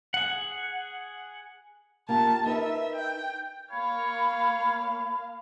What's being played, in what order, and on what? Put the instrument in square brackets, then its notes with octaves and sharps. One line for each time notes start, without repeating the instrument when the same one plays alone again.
[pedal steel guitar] G#4 F#5
[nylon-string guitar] A#3 F4 G4 [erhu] A5
[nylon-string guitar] D#4 A#4 B4 [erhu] E5
[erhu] G5
[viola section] A#3 F5 [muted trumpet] C#5 [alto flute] B5